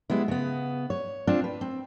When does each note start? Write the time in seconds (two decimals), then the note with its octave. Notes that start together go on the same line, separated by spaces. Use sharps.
0.10 G3 G#3 B3 E4
0.28 C#3 B3
0.90 C#5
1.27 C4 D4 F4
1.44 B4
1.61 C4